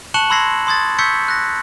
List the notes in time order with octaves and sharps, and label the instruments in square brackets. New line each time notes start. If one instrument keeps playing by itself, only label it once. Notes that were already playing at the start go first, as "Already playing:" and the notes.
[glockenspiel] A5 C#6 F#6 C#7 E7 F#7
B5 C6 E6 G#6 A#6 C7
C6 D#6 G#6 A6
C#6 E6 G6 G#6 B6 C#7
F#6 A#6